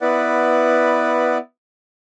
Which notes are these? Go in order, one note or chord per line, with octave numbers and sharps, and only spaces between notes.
B3 E4 B4 D5 F#5